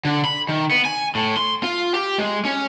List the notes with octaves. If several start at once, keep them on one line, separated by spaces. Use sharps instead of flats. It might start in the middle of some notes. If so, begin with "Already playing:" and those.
D3
B5
D#3
B3
G#5
A2
C6
F4
G4
G#3
C#4